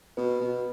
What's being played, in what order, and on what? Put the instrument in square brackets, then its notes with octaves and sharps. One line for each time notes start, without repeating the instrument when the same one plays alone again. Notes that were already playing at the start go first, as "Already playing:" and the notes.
[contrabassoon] B2 [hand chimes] B4
[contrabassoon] B2